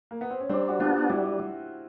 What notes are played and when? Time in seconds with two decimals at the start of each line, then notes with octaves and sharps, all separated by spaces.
0.11 A#3
0.21 B3
0.30 C4
0.40 C#4
0.49 G3 C4 D4
0.69 F#4
0.80 B3 D4 F4 G4
1.10 G3 E4 F#4